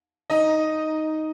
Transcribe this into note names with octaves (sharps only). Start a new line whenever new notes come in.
D#4 D#5